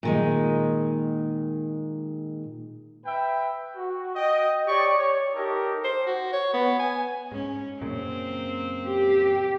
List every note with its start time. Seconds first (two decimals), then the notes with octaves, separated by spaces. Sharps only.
0.03 A#2 D#3 G#3
3.05 B4 E5 G5
3.76 F#4
4.15 D#5 G5
4.67 G4 C#5 D5 C#6
4.98 C#5
5.35 D#4 G4 A4 A#4
5.84 C5
6.06 F#4
6.32 C#5
6.54 B3
6.79 G#5
7.32 G#2 C#4
7.81 F#2 A#2 C#3 A#3 C4
8.86 G4